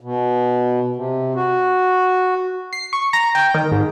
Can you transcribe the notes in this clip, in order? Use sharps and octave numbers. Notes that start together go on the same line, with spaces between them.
B2
C3
F#4
C7
C#6
A#5
G5
D#3
G#2